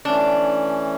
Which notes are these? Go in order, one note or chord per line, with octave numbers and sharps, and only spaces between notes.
E3 A3 C#4 D4